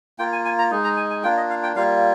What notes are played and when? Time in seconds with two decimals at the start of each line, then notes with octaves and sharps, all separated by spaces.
0.19 A#3 F4 G5
0.32 G#5
0.45 G#5
0.59 A#5
0.71 G#3 D#4
0.84 A#5
0.97 G#5
1.10 G#5
1.23 A#3 D4 F4 G5
1.37 D#5
1.50 F5
1.63 G5
1.76 G3 A#3 F4 F5